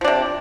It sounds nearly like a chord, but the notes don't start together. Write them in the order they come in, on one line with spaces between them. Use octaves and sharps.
F3 D4 C3